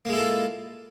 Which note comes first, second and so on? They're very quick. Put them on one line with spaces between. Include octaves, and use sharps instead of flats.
A#3 G#3 E4 A4 F4